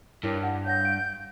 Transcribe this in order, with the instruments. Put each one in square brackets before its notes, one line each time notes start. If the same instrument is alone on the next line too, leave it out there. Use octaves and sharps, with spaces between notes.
[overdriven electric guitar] G2 [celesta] E4 A#4 C#5
[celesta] F#5
[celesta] C#5 F#5 A#6 [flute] G6
[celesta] F5 D7